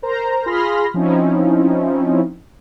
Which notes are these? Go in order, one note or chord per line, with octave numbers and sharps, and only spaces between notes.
A#4 C5 A#5
F4 G#4 B5 C6 F6 A#6
F3 C4 C#4 D#4 E4